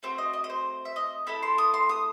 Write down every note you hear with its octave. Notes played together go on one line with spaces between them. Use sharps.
A3 C4 F#4 C5
D#5
D#5
D#5
C5
E5
D#5
A3 E4 A4 B5
C6
D#6
C6
D#6